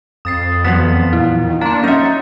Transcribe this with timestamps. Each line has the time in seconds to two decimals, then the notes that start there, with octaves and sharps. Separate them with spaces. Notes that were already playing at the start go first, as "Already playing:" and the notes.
0.25 F2 D#6 A6 C7
0.65 E2 F3 F#3 B3 D#6
1.13 A#2 E4
1.40 D#3
1.61 A#3 D4 A#5 C6
1.84 F#3 C#4 D#4 E5 A6 C#7